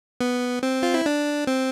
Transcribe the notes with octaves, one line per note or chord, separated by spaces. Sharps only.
B3
C4
F4
E4
D4
C4